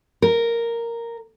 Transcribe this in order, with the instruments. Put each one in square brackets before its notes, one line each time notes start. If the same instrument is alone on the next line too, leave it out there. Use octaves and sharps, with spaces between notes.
[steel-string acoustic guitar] A#4